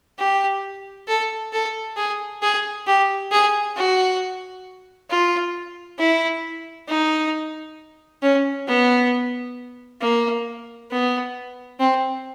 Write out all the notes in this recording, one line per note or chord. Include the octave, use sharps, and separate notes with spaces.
G4
A4
A4
G#4
G#4
G4
G#4
F#4
F4
E4
D#4
C#4
B3
A#3
B3
C4